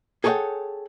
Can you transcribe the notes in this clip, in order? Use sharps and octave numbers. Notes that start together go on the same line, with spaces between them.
G#4 A4 C#5 D5 F#5 G5